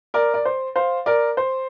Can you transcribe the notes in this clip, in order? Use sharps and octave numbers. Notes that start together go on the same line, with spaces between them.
A#4 D5
D5
C5
C5 F5
A#4 D5
C5